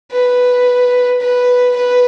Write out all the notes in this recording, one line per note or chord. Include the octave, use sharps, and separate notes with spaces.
B4
B4
B4